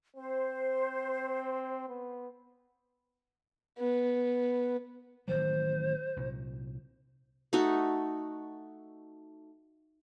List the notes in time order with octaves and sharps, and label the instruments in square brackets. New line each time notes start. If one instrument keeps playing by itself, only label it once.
[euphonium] C4 [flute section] C5
[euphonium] B3
[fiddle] B3
[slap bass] A1 D#3 F#3 [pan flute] C5
[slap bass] C2 A#2
[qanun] A3 D#4 F#4 A4